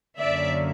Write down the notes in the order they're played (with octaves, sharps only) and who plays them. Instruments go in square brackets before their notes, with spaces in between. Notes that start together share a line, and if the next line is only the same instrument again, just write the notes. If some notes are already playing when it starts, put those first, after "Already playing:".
[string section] F#2 D3 F#3 A#3 C#4 D5 E5